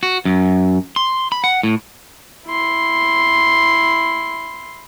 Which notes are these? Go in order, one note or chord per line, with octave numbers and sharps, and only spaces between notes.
F#4
F#2
C6
B5
F#5
A2
E4 C6